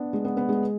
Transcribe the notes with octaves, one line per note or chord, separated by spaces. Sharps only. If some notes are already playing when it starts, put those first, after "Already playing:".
Already playing: B3 D4
G#3
B3
B3
G#3